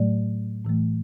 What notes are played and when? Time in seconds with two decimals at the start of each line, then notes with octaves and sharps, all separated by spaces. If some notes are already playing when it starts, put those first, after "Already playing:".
Already playing: A2 F#3 A3 D5
0.65 A2 E3 A3